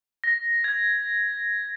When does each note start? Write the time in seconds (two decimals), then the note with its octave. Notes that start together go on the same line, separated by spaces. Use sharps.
0.24 A#6
0.64 G#6